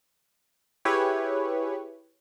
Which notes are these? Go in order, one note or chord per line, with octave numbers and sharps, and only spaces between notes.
E4 G4 G#4 B4 C#5